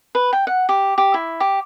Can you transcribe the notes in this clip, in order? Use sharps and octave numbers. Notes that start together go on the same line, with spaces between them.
B4
G5
F#5
G4
G4
E4
G4